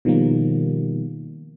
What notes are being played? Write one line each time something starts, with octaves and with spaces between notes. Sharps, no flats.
B2 D#3 F3 G3 A#3